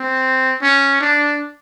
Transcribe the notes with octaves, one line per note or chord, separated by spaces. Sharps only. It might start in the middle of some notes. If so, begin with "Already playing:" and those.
Already playing: C4
C#4
D4